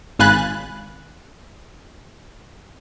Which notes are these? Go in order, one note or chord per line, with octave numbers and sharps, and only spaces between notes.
G#1 F5 G#5 B5 F#6 A6